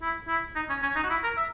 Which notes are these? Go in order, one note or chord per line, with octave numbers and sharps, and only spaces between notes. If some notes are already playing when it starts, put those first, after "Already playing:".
E4
E4
D#4
C#4
C#4
D#4
F#4
E4
A#4
E5